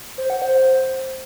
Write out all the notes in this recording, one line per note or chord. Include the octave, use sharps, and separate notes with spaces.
C5
F#5
C5